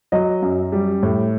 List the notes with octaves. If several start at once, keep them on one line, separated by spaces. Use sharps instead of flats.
F#3 D#5
F#2
G3
A2